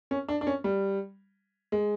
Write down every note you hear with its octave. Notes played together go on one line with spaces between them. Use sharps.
C#4
D4
D4
C#4
G3
G#3